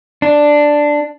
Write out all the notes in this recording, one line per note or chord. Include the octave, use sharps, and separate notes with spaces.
D4